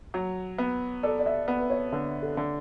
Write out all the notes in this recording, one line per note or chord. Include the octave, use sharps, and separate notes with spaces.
F#3
B3
A4 D5
D5
E5
B3 F#5
B4
C#5
D3 B4
A4
D3